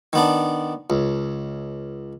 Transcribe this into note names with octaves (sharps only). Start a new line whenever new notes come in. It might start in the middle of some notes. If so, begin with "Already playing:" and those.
D#3 B3 D4
C#2